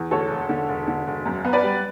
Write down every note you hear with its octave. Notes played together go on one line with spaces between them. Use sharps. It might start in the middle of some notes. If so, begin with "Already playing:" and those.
Already playing: E2
D2 A4 C#5
E1
D3
E1
D3
E1
F#2
B3
B4 D5
G3